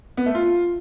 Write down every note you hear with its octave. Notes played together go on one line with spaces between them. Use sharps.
B3
A3
F4